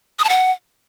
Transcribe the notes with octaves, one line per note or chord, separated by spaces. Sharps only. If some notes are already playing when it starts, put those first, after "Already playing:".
D#6
A5
F#5